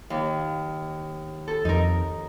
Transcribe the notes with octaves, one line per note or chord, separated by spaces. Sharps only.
D#2
A4
F2 D#4 A#4